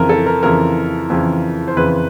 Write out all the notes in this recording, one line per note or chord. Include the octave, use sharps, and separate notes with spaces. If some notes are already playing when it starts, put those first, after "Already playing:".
Already playing: F2 C#3 E3 A#4
A4
A#4
F2 C#3 E3 A#4
F2 C#3 E3
C5
F2 C#3 E3 B4